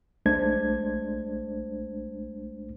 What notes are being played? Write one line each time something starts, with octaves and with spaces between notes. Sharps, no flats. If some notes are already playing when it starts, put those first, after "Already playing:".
A#1 G#3 A3 D4 C5 G#6